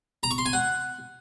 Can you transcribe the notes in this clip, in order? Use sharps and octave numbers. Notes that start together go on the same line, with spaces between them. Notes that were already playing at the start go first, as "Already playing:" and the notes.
A#5
C#6
C6
G#5
F#5